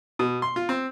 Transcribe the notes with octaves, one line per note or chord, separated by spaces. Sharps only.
B2
C6
F4
C4